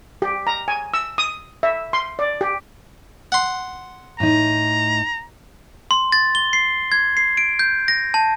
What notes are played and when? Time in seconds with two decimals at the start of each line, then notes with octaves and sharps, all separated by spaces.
0.22 G4
0.47 A#5
0.68 G#5
0.94 E6
1.18 D#6
1.63 E5
1.93 C6
2.19 D5
2.41 G4
3.32 F#5 C6
4.20 A2 D#4 A#5
5.91 C6
6.12 A6
6.35 G7
6.53 C7
6.92 G#6
7.17 C7
7.37 D7
7.59 G6
7.88 A#6
8.14 A5